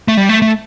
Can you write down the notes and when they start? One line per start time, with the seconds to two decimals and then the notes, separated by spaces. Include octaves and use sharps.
0.08 A3
0.17 G3
0.29 A3
0.42 A3